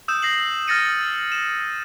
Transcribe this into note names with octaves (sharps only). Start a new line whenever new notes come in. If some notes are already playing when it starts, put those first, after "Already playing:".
D#6 E6 G6 E7
A#6 C7 F#7
F6 A6 A#6 C#7 D#7
E7